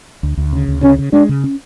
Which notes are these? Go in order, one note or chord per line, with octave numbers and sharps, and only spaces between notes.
D2
D2
C#3
D2
C#3 C#4
C#3
G#3 D4
C#3
C#4